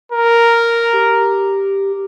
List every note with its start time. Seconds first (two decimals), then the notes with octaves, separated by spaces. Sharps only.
0.12 A#4
0.93 G4